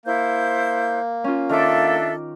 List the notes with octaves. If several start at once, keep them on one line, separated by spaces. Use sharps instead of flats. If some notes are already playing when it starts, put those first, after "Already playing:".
A#3 E4 C5 G6
C#4 F4
D#3 D4 A4 E5 D6